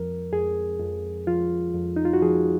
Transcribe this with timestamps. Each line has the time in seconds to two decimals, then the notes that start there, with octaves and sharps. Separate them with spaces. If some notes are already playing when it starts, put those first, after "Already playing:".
Already playing: F2 F3 A#4
0.33 F2 G#4
0.80 F2
1.27 F3 F4
1.75 F2
1.96 D#4
2.05 F4
2.13 F#4
2.22 F3 G#4